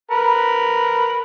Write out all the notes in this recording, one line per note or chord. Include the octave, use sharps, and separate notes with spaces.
A#4 B4